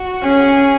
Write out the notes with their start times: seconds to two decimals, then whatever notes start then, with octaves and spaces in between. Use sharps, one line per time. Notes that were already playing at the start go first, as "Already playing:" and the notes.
Already playing: F#4
0.23 C#4 G#4